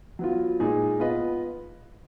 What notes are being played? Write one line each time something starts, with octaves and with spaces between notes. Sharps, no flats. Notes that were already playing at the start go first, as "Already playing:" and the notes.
F#3 B3 F4
A#2 G#3 D#4 G#4
B3 F4 B4 D#5